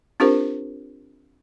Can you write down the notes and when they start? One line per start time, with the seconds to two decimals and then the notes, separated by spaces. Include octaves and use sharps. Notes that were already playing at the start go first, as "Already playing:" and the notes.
0.20 C4 D4 F4 G4 A#4 C5